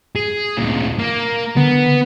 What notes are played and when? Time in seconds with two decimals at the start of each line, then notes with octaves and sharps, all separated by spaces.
0.16 G#4
0.58 D2 A#2
0.99 A#3
1.57 D3 B3